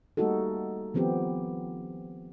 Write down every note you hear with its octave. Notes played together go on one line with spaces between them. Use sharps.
G3 A3 A#3 D#4 F#4 A4
D#3 F3 B3 C4 G4